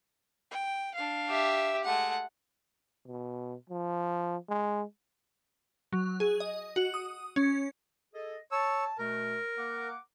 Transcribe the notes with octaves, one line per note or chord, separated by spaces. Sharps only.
G5
D4 F5
G4 E5
G#3 A3 F#5
B2
F3
G#3
F#3
G#4
D#5
F#4
D#6
C#4
G#4 A4 D#5
C#5 A5 E6
B2 A3 A#4
A#3 F#5 D6